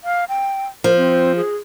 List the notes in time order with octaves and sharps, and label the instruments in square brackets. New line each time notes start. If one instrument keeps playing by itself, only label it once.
[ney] F5
G5
[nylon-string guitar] F3 [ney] A#4
[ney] C4
G#4